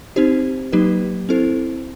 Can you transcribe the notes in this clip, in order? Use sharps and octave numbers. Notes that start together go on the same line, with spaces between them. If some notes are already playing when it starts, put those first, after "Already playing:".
C4 D#4 G4 C5
F#3 A#3 D#4 G4 B4
C4 E4 A4 C5